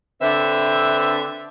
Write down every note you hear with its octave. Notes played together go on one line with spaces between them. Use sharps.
D3 C4 B4 E5